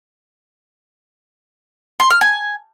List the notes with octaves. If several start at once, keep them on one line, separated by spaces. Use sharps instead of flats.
C6
F6
G#5